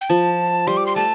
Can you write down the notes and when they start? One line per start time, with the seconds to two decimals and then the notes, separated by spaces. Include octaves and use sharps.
0.01 G5
0.10 F3 A5
0.67 G3 C6
0.77 D6
0.87 C6
0.96 A3 A5